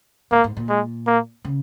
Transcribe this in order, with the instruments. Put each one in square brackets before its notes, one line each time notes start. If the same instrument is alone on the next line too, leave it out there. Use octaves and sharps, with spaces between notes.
[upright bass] G#2 [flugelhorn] A#3
[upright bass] G#2
A#2
[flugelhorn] G#3
A#3
[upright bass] C#3